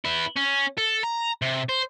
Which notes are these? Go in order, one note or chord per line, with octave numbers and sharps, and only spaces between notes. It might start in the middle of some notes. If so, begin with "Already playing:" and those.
B3 E4
C#4
A4
A#5
C3
C5